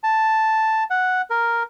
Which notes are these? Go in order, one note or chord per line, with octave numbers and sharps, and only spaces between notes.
A5
F#5
A#4